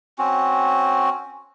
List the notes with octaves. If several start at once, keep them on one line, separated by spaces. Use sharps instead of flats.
C4 C#4 F#4